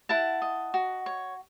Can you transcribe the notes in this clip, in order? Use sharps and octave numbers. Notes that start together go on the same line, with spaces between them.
E4 F#5 A5
D#5
F#4
C#5